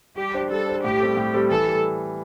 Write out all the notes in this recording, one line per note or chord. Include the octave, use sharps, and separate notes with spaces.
G3 G4
D4 C5
G3 A4
D4 C5
A2 G4
G3 C4 A4
A2
G3 C4 A4
E3 A4
G3